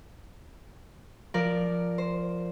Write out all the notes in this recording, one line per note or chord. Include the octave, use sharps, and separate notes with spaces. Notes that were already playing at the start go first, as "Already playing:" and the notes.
F3 A#4 D5
C5